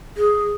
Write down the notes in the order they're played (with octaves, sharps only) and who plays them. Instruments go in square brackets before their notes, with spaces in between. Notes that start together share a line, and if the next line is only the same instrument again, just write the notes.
[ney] G#4